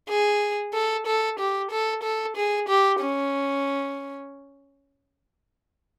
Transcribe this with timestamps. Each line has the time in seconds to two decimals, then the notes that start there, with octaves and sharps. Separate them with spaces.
0.09 G#4
0.74 A4
1.07 A4
1.39 G4
1.71 A4
2.03 A4
2.36 G#4
2.69 G4
3.00 C#4